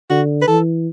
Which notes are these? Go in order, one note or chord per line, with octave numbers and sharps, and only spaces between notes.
D3 F#4
B4
E3 A4